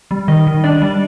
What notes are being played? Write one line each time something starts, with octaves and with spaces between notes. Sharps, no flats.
G3
D#3 D#5
D#3
D4 D5
G3